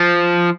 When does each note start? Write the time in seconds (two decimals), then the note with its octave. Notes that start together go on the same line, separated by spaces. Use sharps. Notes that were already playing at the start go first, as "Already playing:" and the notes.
Already playing: F3